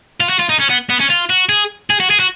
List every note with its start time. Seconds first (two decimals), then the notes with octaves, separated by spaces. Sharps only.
0.20 F4
0.29 F#4
0.39 F4
0.49 D#4
0.59 C#4
0.70 B3
0.89 B3
1.00 C#4
1.09 F4
1.30 F#4
1.49 G#4
1.90 G#4
2.00 F#4
2.10 G#4
2.20 F#4